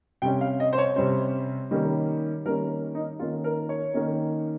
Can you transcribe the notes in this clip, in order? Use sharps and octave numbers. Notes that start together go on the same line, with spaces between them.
C3 G3 C#4 G5
F5
D#5
C5
C#5
C3 G3 C#4 C5
D#3 G3 A#3 C#4
D#3 G3 A#3 C#4 A#4
D#4
D#3 A#3 C#4 F4
A#4
C#5
D#3 A#3 C#4